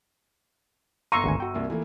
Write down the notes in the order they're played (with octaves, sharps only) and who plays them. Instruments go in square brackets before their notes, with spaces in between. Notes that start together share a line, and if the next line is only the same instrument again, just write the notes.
[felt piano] G1 E6 D#7 [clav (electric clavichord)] F5 [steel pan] A#5 C6 C#6
[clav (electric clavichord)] G#1 D2 G#5
F#4 G5
[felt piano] C2 A#3
E3 A3 A#3